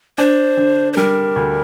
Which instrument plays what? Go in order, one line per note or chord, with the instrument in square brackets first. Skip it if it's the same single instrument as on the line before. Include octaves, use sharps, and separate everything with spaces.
[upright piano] D4 [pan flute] C5
[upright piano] D3
[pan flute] C5
[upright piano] G3 [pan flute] A#4
[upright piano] D2